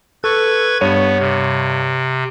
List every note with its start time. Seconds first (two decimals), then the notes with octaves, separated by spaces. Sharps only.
0.24 A4 B4 C#6 G#6
0.81 G2 B3 C#5 D#7
1.19 C3